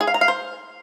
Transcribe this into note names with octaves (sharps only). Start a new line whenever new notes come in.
G#4
F5
A#5
F5
C5